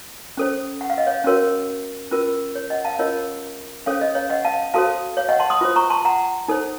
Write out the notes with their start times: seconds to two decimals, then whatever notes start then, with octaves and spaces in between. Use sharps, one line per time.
0.37 C#4 A4 C5
0.81 F#5
0.90 F5
0.98 D#5
1.07 C#5 F5
1.24 C#4 F#4 A#4 C#5
2.11 C#4 F4 A#4
2.55 C#5
2.70 D#5 F#5
2.85 F5 A5
2.99 C#4 F4 A#4 C#5 D#5
3.86 C#4 A4 C5 C#5 F5
4.01 D#5
4.15 C#5 F5
4.30 D#5 F#5
4.45 F5 A5
4.74 F#4 A4 C5 F5 A5
5.17 C#5 F5
5.28 D#5 F#5
5.39 A5 C6
5.50 C6 D#6
5.61 F4 C5
5.76 A#5 C#6
5.90 A5 C6
6.05 F#5 A#5
6.48 D#4 A4 C5